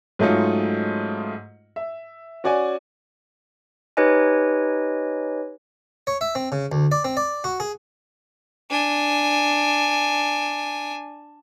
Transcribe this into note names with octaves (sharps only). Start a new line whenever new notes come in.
G#2 F#3 A3 C#4 D#4 F4
E5
C#4 F#4 D5 G#5
D#4 G4 B4 C#5 D#5 G#5
C#5
E5
C4
C#3
D2
D5
C4
D5
F#4
G#4
D4 G#5